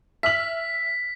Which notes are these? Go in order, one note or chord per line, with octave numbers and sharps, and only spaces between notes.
E5 F6 B6 F#7